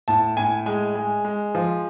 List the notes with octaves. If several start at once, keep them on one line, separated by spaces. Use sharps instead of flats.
A2 A5
A2 G#5
G#3 G#5
G#3
G#3
F3